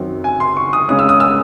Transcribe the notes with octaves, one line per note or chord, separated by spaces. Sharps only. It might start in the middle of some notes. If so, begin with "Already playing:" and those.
Already playing: F#2 D#3 F#3 C4
G#5
C6
C#6
D#6
C#3 G#3 C#4 D#6
E6
D#6
E6